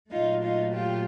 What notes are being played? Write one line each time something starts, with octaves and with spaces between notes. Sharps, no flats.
A#2 F#3 A3 D#4 F4
D#4 F4
F4 G4